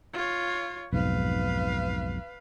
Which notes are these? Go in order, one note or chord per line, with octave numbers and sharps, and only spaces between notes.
F4 C#5
B1 F2 G#2 B4 F5